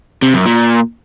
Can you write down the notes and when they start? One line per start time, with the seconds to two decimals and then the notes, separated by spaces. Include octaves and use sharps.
0.22 C3
0.34 F#2
0.46 A#2